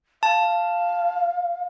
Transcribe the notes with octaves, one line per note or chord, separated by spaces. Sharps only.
F5 A5